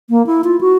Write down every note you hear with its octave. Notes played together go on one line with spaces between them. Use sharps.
A#3
E4
F4
F#4